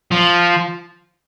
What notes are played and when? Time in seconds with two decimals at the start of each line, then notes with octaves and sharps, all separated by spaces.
0.11 F3